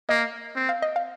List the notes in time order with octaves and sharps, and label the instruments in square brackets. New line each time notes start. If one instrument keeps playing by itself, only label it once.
[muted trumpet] A#3 [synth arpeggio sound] D#5
[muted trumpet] C4
[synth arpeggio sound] F5
D#5
F5